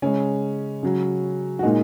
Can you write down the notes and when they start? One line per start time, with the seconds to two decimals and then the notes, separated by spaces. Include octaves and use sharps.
0.02 C#3 G#3 C#4
0.83 C#3 F#3
1.59 F#4
1.63 A#2 G#3 D#4